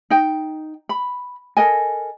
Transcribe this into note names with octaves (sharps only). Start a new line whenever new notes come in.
D#4 G5
B5
A4 A#4 D#5 G#5